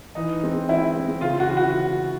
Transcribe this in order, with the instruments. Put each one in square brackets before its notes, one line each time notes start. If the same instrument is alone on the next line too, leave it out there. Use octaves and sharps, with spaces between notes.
[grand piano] E3 [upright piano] D#4
[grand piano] G#3 C4
[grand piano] E3 [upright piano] E4
[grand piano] G#3 C4
[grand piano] C#3 [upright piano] F4
[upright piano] F#4
[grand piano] E3 G#3 C#4 E4
[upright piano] F#4